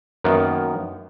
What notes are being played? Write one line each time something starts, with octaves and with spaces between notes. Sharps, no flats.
F#2 D#3 A#3 B3